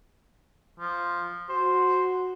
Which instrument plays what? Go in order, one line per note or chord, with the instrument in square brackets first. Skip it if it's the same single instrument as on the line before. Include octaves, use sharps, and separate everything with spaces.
[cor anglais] F3
[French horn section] F#4 [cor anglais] C5